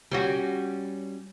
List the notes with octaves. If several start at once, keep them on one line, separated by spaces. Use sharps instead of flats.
G3 C#4 F#4